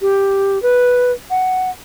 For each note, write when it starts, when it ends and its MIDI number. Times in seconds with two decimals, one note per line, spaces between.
0.01 0.61 67
0.63 1.12 71
1.30 1.70 78